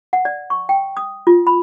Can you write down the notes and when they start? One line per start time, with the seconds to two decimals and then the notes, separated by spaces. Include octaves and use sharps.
0.13 F#5
0.25 D5
0.50 C#6
0.69 G5
0.97 D#6
1.27 F4
1.47 B5